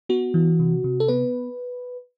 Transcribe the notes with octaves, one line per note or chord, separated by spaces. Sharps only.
B3 F#4
E3
C3
C3
A4
B3 B4